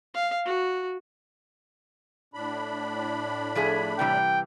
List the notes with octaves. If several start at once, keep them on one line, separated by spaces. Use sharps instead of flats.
F5
F#4
A2 D4 B5
F3 A3 G#4
C3 E3 G3 G5